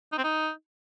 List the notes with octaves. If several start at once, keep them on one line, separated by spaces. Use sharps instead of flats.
D#4
C4
D#4